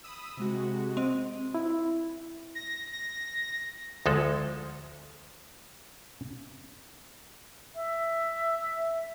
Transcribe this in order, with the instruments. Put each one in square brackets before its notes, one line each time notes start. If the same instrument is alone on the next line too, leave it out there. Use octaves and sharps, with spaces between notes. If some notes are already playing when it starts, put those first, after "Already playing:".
[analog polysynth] B5 D#6 E6
C3 G#3 F#4
[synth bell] C4 D#5
[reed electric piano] E4
[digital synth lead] A#6
A#6
[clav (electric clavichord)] D2 F3 G#3 A4
[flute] E5